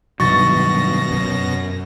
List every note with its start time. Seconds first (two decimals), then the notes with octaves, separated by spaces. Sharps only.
0.20 G2 B2 D#3 F#3 C#6 A6 A#6
1.11 F#2